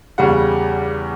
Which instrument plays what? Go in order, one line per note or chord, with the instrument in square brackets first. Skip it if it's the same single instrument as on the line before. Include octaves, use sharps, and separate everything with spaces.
[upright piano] E2 C#3 G3 F#5